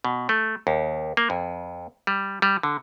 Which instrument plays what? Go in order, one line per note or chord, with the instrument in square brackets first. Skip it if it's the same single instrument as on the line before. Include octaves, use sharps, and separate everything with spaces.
[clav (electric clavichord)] B2
A3
D#2
A#3
F2
G3
G3
D3